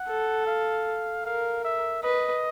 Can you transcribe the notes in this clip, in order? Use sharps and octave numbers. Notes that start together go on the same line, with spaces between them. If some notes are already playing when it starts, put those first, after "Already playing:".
Already playing: F#5
A4
F5
A#4 F5
E5
B4 D#5